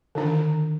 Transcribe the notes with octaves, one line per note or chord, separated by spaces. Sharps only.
D3 D#3 D4